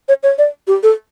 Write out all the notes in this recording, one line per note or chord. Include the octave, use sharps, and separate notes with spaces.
C#5
C#5
D5
G4
A4